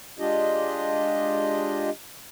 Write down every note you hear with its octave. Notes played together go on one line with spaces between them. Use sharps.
G#3 D4 F4 G4 D#5